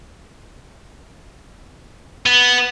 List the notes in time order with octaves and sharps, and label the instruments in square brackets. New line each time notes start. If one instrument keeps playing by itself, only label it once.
[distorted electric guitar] B3